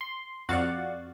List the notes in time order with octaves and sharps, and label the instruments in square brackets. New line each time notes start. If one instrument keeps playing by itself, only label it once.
[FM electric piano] C6
[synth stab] F2 F#4 A6 [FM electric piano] D5 F5 F#5